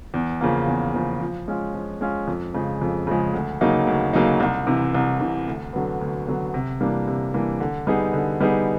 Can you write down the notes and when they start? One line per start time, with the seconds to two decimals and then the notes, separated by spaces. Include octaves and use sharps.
0.14 E2
0.41 C#3 F3 A#3
0.67 E2
0.94 C#3 F3 A#3
1.21 F3
1.48 G#3 C#4 F4
1.74 F3
2.01 G#3 C#4 F4
2.27 F2
2.54 C#3 F3 G#3
2.81 F2
3.07 C#3 F3 G#3
3.34 D2
3.61 C#3 F#3 A#3 D#4
3.87 D2
4.13 C#3 F#3 A#3 D#4
4.40 C2
4.67 C3 E3
4.95 C2
5.21 C3 E3
5.48 D2
5.73 D3 F#3 B3
6.01 D2
6.27 D3 F#3 B3
6.54 C3
6.81 E3 G3 A#3 D4
7.08 C3
7.34 E3 G3 A#3 D4
7.60 D3
7.87 G3 B3 D#4 G#4
8.13 D3
8.41 G3 B3 D#4 G#4